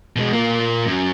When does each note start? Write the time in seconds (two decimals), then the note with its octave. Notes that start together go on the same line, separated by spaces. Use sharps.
0.16 B2 G#3
0.32 A#2 A#3
0.86 F#2 F#3